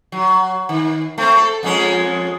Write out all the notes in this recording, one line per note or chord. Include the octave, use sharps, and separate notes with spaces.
F#3
D#3
A3 C4
A4
F2 G#3 C#4